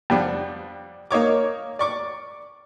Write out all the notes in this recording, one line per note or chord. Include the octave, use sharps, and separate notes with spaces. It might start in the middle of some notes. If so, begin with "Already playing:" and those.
F2 G3 B3 D4
A#3 D#4 C#5 D6
D5 C#6 D6